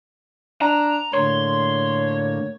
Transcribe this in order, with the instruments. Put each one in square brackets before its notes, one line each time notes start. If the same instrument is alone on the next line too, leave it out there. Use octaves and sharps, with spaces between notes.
[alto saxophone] D4 [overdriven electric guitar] A#5
[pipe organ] A2 D3 A#3 [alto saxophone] C#5 [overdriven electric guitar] C6